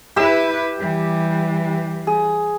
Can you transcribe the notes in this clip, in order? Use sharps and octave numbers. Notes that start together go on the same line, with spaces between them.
E4 G4 B4 E6
E3 G3
G#4